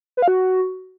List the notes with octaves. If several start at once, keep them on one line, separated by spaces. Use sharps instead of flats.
B4
F5
F#4